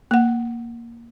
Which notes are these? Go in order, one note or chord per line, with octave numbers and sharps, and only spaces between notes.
A#3 F#5